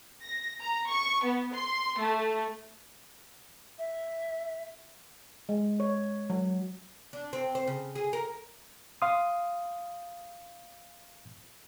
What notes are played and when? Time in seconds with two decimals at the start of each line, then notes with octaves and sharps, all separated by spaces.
0.21 A#6
0.60 A#5
0.89 C#6
1.24 B3
1.53 C6
1.98 A3
3.79 E5
5.49 G#3
5.80 C#5
6.30 F#3
7.13 D4
7.33 C4
7.55 C5
7.67 C#3
7.95 G#4
8.13 A#4
9.02 F5 C6 D#6